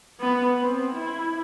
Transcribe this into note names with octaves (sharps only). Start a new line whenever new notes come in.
B3
C4
E4